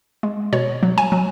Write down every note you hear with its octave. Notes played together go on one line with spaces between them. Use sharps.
G#3
B2 C#5
F#3
G#5
F#3